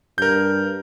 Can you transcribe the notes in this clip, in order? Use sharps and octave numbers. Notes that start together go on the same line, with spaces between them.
G2 A#4 G6